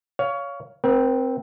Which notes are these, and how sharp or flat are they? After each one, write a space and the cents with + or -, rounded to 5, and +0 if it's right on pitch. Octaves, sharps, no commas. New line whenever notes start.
C#5 +20 F5 +0
C4 +0 A#4 +45